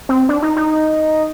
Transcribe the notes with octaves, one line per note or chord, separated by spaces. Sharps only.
C4
D4
D#4
D#4